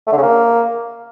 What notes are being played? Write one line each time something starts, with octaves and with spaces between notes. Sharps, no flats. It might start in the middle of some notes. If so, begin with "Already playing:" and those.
A3
D3
C#3
A#3